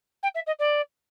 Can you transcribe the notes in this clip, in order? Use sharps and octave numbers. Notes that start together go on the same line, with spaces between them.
G5
E5
D#5
D5